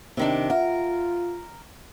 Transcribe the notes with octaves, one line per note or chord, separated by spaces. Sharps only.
C3 D#3 D4
F4 A#4 E5 F#5